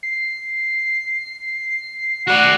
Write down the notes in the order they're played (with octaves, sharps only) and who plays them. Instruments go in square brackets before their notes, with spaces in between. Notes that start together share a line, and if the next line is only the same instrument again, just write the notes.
[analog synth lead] C7
[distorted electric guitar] F#4 D5 [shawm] F#5